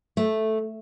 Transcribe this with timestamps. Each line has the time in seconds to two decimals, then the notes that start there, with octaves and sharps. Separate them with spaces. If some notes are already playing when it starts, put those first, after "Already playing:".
0.17 A3